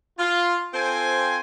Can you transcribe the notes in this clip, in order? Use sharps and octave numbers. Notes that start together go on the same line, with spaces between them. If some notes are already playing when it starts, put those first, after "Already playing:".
F4
C4 F4 A4 C5 G5 G#5